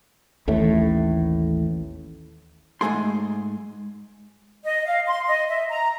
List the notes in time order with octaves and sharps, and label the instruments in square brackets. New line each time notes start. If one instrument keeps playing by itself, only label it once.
[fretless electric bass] A1 D#2 A2 A3
[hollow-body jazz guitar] G#2 B2 A3 G#4 C6
[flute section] D#5
F5
C6
D#5
E5
A#5